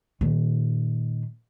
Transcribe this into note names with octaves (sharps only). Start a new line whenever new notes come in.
A#2 D#3